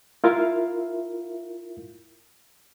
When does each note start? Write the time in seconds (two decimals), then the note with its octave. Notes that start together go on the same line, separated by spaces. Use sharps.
0.24 E4 F4 A#4 E5 F5